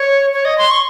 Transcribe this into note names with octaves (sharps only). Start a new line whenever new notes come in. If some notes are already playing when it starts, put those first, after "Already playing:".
Already playing: C#5
C#5
D#5
C6
C#6